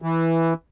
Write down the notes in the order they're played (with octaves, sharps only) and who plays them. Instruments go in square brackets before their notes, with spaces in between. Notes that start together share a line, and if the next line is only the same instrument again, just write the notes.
[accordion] E3